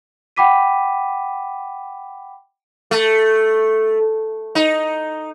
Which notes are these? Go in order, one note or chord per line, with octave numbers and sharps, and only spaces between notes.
F#5 G5 B5 D6 B6 D#7
A3
D#4